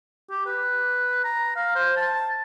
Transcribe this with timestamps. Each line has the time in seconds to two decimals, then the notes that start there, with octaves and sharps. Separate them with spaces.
0.30 G4
0.46 B4
1.24 A#5
1.56 F5
1.75 C5
1.96 A5